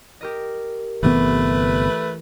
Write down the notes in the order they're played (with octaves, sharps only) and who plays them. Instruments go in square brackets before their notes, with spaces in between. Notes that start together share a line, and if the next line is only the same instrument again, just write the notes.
[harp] G4 A#4 D#5
[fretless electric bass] G1 C3 B3 [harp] E3 [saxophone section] A3 B4